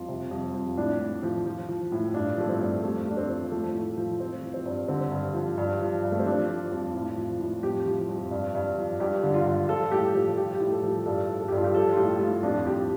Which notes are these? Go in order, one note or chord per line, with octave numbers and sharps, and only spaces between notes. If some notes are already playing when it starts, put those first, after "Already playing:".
Already playing: F2 F4
C3
F2
F2
A2 D4
A2
F3
F3
F3
A2
G2 D4
F3 A3
C4
G2
F2 A3
F2
D4
C4
F3
F3 A3
A2
F3
F3 C4
F3
C4
G2
D3 C4
G2
F3
G2
F3
G2
A3
C4
F3 D4
F3
F2
A2
F3
A2
F2 G4
F3
F2
G2
G2
F3
G2 G4
D3
F4
G2
F3 A4
A2 G4
F3 A4
F3 G4
G4
A2
A4
F3
G4
G2 A4
G2
A4
G4
G2
F4
G4
F3 A4
F4
A2 G4
A2 F4
F2 D4
F2 G4